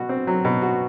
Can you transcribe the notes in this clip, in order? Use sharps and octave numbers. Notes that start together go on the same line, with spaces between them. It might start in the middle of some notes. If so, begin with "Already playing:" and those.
Already playing: B2 F#4
C4
F#3
B2
F#4